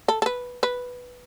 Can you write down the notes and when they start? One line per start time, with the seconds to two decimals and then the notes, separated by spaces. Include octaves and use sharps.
0.08 A4
0.22 A4
0.26 B4
0.63 B4